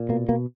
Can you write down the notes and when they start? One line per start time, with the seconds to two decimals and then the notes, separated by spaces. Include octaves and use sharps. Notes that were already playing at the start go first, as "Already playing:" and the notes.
Already playing: A#2
0.09 B2 A#3
0.28 B2 A#3